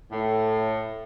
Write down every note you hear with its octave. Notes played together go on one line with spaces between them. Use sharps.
A2